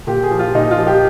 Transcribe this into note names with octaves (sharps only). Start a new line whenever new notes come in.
A#2 G4
G#4
F3
F4
A#2 D#4
F4
F3
G4